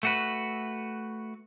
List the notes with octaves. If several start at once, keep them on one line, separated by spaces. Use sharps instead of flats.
A3 F#4 B4